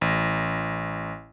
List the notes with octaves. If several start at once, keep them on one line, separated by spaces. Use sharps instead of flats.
A1